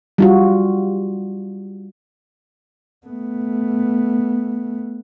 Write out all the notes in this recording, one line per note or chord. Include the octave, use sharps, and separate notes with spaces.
G3 F4 F#4
A3 B3